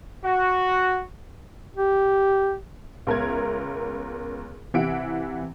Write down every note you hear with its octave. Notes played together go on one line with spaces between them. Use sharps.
F#4
G4
C#2 B3 A#4 E5 A#5 G#6
C3 E3 G4 E5 F#5 D7